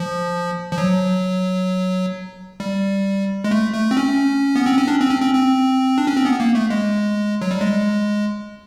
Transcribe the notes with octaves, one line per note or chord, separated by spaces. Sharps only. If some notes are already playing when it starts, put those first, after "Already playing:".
Already playing: F3
F3
F#3
G3
G#3
A3
A3
C4
C#4
B3
C4
C#4
D4
C4
C#4
C4
C4
D4
C#4
C4
B3
A#3
A3
G#3
F#3
G3
G#3